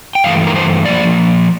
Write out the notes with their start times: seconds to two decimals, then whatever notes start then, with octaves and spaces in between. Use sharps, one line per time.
0.15 G5
0.24 G2 E3 A3 F5
0.47 A#4
0.56 C5
0.85 A2 F3 A#3 D5